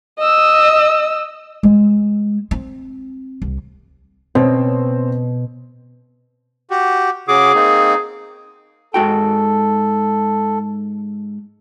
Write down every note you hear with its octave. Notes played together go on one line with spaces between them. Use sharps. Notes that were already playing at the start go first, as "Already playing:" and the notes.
D#5 E6
G#3
C4
C2
B2 C4 C#4
F#4 G4
C#3 F#4 G#4 D6
A#3 C4 D#4
G#2 F#4 A4 G5